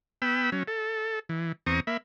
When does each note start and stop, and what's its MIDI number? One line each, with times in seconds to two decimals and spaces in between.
0.22 0.50 59
0.22 0.50 79
0.22 0.50 83
0.22 0.50 88
0.52 0.63 54
0.52 0.63 61
0.68 1.19 69
1.29 1.52 52
1.66 1.80 40
1.66 1.80 60
1.66 1.80 82
1.66 1.80 85
1.66 1.80 87
1.87 1.97 58
1.87 1.97 76
1.87 1.97 83